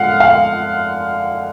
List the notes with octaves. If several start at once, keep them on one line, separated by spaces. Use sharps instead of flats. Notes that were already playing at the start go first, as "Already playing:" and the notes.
Already playing: D3 G#3 F5 F#5
F5